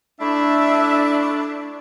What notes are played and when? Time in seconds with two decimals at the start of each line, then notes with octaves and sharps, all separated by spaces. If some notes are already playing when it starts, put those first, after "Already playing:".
0.20 A3 D4 E4 E5